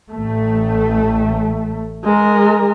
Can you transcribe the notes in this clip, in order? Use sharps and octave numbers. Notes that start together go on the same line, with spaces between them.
A1 A3
G#3 A#4